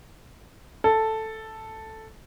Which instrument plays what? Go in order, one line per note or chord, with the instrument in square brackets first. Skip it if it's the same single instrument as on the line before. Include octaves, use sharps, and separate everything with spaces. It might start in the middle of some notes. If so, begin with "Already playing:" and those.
[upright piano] A4